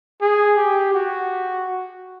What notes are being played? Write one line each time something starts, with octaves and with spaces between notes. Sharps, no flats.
G#4
G4
F#4